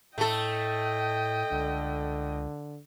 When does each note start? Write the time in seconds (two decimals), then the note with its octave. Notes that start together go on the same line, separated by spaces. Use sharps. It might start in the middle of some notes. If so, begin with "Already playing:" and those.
0.18 A2 A3 A4 D#5 G5
1.52 C#2 D3